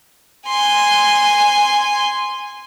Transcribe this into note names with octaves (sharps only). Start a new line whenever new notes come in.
G#5 C6